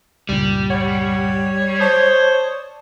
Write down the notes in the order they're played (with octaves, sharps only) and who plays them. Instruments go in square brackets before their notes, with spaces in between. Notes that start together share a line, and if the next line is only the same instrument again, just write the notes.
[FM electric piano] C#2 G2 A#2 [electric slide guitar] G3
[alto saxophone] C#5 [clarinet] F#5
[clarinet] C5 [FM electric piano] D5 A5 D#6